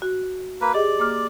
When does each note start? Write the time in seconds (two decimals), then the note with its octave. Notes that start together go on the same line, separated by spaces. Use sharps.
0.02 F#4
0.61 A#3 B4
0.73 G4 G#4 D5 D#5
0.99 A#3 D6 F6